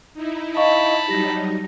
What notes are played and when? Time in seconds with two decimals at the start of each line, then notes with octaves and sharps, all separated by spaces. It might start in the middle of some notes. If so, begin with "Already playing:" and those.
0.14 D#4 E4
0.57 D#5 F5 A5 B5 C#6
1.08 F#3 G3 D#4 G4 A#6